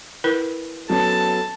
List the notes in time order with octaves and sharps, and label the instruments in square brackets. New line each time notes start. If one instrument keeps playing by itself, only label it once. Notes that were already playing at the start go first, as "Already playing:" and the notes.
[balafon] E4 A#4 B4
[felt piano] F#3 B3 C#4 [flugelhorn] A4 [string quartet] A5